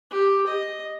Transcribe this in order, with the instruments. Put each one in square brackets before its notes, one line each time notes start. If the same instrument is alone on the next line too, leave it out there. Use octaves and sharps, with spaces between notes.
[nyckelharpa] G4
D#5